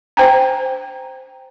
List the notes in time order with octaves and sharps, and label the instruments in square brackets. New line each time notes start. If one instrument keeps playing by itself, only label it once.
[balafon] C5 G5 G#5 A#5